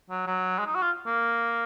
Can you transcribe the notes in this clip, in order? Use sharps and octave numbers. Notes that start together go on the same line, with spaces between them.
F#3
F#3
G#3
D#4
F#4
F4
A#3